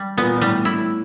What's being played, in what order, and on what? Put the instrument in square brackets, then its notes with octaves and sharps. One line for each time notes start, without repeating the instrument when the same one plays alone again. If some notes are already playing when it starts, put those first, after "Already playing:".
Already playing: [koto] G3
[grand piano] A#2 [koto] B3
[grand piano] A#2
[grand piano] A2 [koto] G3
[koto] E4